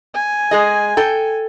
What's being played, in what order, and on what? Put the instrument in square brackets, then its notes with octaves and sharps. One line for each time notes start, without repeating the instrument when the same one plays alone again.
[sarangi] G#5
[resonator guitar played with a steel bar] G#3 G#4 D#5
A4 G5